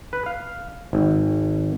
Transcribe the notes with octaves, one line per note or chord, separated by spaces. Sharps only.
B4
F5
G#1